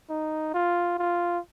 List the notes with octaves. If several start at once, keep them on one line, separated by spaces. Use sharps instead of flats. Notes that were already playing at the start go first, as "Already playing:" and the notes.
D#4
F4
F4